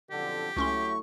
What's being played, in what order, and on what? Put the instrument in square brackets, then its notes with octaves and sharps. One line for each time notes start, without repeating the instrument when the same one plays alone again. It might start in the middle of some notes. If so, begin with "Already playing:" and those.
[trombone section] B1 F2 D3 [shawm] G4
[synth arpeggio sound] C#2 C#4 C6 [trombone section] F#3 A3 E4 [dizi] C#6